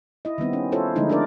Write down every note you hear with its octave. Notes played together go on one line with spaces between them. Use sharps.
E4 D#5
D#3 G3 B3 C4
C#4
E4 F4 A4 C5 C#5
D3 F3 G#3 A3 D#4 E4
D4 D#4 A#4 D5